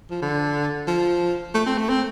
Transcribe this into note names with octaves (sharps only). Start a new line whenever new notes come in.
F3
D3
F3
A3
C4
A3
C4